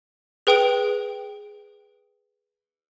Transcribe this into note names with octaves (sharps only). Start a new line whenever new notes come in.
G#4 B4 G5 D#6 D7